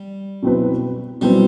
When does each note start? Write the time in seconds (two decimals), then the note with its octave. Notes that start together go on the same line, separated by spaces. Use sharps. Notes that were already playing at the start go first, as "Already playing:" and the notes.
Already playing: G3
0.43 B2 F#3 C4 E4 B4
1.21 B2 F#3 G3 C4 E4 B4